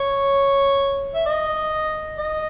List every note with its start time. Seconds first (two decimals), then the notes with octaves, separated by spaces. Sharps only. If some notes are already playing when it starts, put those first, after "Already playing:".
Already playing: C#5
1.14 E5
1.26 D#5
2.18 D#5